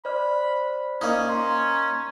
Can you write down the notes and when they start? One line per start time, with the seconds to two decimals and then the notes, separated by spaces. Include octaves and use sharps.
0.05 C5 D5 B5 F6
1.01 A#3 C#4 D#4
1.29 A#5 C6